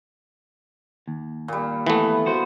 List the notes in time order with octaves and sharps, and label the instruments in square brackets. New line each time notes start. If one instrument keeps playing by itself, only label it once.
[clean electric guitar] D#2
[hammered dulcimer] A#2 G3
[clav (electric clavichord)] E3 A3 [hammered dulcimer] B3
[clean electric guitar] F#4 C5